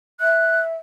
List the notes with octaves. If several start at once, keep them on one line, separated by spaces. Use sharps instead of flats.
E5 F#6